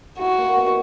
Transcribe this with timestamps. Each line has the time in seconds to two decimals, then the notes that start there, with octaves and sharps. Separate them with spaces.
0.20 E4 F#4
0.38 A#3
0.57 B2